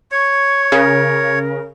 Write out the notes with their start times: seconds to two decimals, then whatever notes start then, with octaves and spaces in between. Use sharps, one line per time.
0.12 C#5 C#6
0.72 C#3 A#4